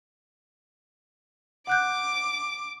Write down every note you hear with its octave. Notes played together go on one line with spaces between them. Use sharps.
F#5 D6 F#6 G6